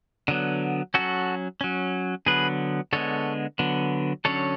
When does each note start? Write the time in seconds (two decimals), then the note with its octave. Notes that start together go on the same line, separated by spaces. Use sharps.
0.28 D3 F#3 B3
0.94 F#3 C#4 F#4 A4
1.61 F#3 C#4
2.26 D3 F#3 B3 G#4 B4
2.93 D3 G#3 B3 A4 C#5
3.59 D3 F#3 B3
4.25 D3 F#3 C#4 A4 C#5